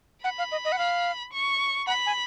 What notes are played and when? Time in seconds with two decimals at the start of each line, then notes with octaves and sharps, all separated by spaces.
0.24 F#5 B5
0.38 F5
0.52 D#5
0.65 D#5
0.72 F#5
0.79 F5
1.33 C#6
1.87 F#5 B5
2.06 G#5